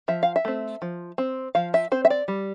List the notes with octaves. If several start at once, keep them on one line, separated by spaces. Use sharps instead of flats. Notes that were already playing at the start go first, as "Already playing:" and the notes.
F3 E5
F5
E5
A3 C4
F3
C4
F3 F5
E5
C4 C5
E5
D5
G3